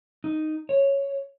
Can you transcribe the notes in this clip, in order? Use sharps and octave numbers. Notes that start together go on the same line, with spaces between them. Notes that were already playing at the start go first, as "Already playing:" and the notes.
D#4
C#5